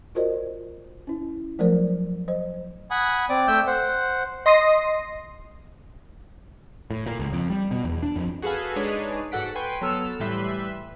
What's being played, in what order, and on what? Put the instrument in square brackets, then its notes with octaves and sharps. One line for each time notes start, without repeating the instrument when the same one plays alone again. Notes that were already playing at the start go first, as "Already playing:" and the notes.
[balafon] F4 F#4 A#4 C5 D5 D#5
C#4 E4
F3 F#3 A3 A#4 C5 D5
C5 D#5
[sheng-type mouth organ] F#5 G#5 B5 D#6
C4 D5 D6
A3 E5 G5 E6 G6
C5 F#5
[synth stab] D#5 C6 D#6 A#6
[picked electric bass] A2
A#2
C#2
F2
G3
B2
E2
D4
F2
[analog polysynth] F#4 G#4 A4 B4 F5 G#5
G#3 D4 D#4 G#4 B4 C#5
G#2 F#4 A4 F#5 B6 D7
B4 G5 G#5 C6 C#6
F#3 B3 A4 E6 F6
A2 E3 G3 B4 E5 C6